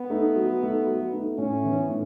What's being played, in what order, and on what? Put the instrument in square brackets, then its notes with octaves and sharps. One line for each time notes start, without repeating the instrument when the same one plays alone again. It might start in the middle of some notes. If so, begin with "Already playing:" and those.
Already playing: [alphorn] B3
[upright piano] A3 D#4
F#3
A3 D#4
F#3
A3 D#4
[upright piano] A2 [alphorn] C#4
[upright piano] E3 B3
A2